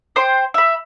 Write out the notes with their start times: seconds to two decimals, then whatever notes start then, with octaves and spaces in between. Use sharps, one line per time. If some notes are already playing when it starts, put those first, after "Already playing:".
0.16 C5 G5 C6
0.54 E5 B5